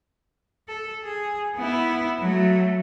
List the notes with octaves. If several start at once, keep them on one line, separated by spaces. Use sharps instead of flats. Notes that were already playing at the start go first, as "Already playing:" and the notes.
A4
G#4
B3 E4
F#3 A3